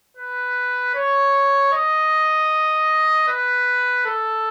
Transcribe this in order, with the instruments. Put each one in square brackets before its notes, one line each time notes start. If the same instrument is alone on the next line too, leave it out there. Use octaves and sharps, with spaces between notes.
[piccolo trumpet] B4
C#5
D#5
B4
A4